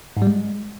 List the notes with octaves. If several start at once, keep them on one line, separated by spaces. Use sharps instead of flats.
G#2
G3
G#3